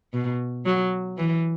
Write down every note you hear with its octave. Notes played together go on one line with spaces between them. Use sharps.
B2
F#3
E3